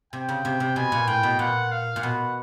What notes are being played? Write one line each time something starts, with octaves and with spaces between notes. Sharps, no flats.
C3 G5
C#3
C3
C3
B2 G#5
A#2
A2 G5
B2
A#2 F#5
F5
A#2
B2 F#5